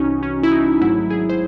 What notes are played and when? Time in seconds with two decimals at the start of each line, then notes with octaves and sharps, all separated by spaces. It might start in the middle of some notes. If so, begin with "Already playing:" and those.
Already playing: C2 C3 E3 C#4 D#4 F#4
0.23 C#4
0.43 E4
0.52 D#4
0.81 G#1 G#2 F#3 A3 E4
1.10 G#4
1.29 C5